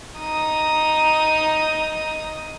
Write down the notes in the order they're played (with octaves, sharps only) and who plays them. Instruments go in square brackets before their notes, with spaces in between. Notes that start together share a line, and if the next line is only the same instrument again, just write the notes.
[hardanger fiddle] D#4 D#6